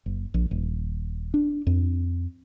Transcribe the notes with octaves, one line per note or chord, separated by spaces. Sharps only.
F#1
A#1
D#1
D4
F2